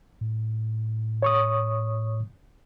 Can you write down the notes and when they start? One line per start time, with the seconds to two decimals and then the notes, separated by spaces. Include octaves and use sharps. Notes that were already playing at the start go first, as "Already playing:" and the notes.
0.21 A2
1.22 C#5 C#6 D#6